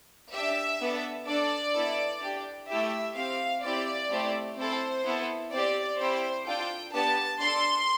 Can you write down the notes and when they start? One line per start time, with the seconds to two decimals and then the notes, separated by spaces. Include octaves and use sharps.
0.33 D4 G4 E5
0.80 B3 D4 A4
1.27 D4 A4 D5
1.74 B3 E4 A4
2.22 D4 G4
2.69 A3 E4 G4 E5
3.16 C4 G4 F5
3.63 C4 E4 G4 D5
4.11 A3 C4 E4 G4
4.57 C4 E4 A4 C5
5.05 B3 E4 A4
5.52 C4 G4 D5
5.99 C4 E4 G4 C5
6.45 D4 F4 A4 G5
6.93 B3 D4 G4 A5
7.40 D4 A4 C6